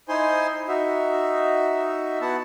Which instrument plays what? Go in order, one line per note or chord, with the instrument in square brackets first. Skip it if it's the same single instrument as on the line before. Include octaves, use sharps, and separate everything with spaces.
[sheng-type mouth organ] D#4 E4 C5 G#5 C6
D#4 F#4 E5
B3 E4 F#4 F#5 A5